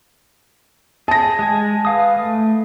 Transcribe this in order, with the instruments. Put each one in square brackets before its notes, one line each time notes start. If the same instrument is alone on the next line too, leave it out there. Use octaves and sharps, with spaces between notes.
[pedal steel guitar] G#4 [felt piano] A5 A#6
[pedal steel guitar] G#3 G#5
B4 F5 D#6
A3